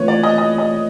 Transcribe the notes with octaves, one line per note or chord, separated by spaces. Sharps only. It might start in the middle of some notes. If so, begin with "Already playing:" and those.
Already playing: E3 A3 C4 F4 B4 C#5
D5
D#5
D#5
D#5